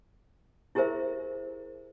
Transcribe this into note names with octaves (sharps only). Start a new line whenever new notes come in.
E4 G4 G#4 A#4 C5 E5